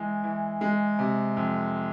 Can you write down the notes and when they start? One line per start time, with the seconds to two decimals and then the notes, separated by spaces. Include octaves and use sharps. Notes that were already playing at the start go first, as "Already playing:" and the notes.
Already playing: E3 G#3
0.24 E3
0.61 G#3
0.99 C3
1.37 F2